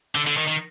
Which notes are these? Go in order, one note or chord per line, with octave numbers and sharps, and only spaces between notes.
D3
D3
D#3
D#3